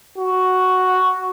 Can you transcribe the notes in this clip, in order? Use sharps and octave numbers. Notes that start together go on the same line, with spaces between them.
F#4